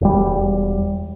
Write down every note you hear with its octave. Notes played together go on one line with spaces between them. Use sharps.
E1 G3